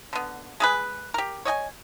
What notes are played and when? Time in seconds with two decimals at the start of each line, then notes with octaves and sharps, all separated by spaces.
0.13 D3 B3
0.60 G#3 G#4 B4
1.14 G4 A#4
1.45 C#5 D#5 G5 G#5